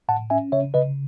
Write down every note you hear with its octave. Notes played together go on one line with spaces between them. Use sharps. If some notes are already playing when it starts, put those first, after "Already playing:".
A2 F#5 A5
C#4 E5 G#5
C#3 C#5 E5
C#3 B4 D#5